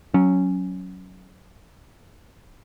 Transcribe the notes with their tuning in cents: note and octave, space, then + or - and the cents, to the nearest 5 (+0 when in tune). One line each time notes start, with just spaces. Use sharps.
F#3 +0 C#4 +0